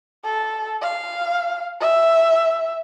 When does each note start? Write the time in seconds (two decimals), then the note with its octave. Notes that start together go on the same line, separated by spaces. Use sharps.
0.24 A4
0.82 F5
1.81 E5